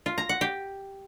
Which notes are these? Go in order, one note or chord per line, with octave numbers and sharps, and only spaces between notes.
F4
A#5
F#5
G4